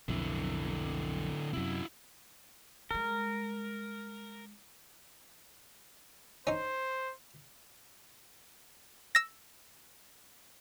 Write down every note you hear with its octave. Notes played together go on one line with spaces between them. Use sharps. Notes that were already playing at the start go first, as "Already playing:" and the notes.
B1 F2 D3 E4
F#2 C3 E4 F#4
G3 G#3 A#4
C#4 D#4 C5
E6 A#6